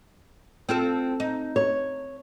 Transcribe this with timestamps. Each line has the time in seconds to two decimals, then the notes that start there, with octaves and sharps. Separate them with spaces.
0.69 C4 F4 A4
1.20 D#4
1.56 C#5